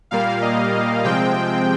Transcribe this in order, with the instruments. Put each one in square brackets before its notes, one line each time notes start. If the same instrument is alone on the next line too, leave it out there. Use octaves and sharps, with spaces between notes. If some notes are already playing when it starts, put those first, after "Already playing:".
[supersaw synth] A#2 G3 A#3 F5
D#5
D#5
C3 F3 G#3 C4 G5